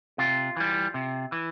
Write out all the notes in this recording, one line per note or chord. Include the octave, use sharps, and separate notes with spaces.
C3 F4
E3 G3
C3
E3